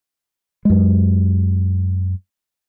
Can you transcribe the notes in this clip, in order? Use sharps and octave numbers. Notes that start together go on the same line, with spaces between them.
F#2 G#3